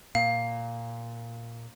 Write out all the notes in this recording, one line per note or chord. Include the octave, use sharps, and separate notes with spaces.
A#2 F5